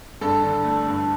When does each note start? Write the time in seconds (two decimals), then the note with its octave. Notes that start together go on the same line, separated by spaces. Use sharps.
0.21 G2 A4
0.43 D3
0.64 A3
0.87 G2